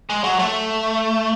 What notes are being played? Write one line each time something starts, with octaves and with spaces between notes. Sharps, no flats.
G#3
F#3
A3